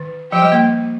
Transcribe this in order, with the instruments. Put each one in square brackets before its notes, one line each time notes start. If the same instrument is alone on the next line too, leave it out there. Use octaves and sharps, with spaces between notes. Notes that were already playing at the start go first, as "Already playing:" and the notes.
Already playing: [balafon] D#3
[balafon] F3 [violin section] G4 C5 G5
[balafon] G3
A#3